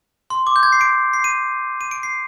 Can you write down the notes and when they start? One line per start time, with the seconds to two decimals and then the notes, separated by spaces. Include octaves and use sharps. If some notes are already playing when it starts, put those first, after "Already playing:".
0.30 C6
0.47 D6
0.56 G6
0.63 G#6
0.72 C7
0.81 D7
1.13 C7
1.24 D#7
1.81 D#7
1.91 D7
2.03 C7